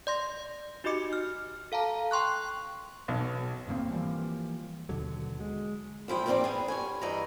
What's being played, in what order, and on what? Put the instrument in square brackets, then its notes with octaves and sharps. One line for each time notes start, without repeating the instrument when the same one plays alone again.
[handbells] D5 C6 A#6
D#4 F#4 G4 D#5 D6 C#7
F6
A4 F5 A5 A#5
G5 C6 C#6 F#6
[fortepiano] B1
[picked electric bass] G#1 D2 A#3 C4
E3 F3 G3 A#3
D#2 B2 D3 F#3
G#3
[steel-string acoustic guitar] E2 F3 E4 G5
D#3 E3 G3 A#3 C4 D5
B3 G#4
G2 C#5 G#5
G2 E3 D#5 A#5